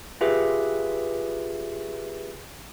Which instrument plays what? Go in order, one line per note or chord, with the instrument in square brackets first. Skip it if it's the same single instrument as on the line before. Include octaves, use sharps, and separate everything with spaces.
[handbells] F4 G4 G#4 B4 E5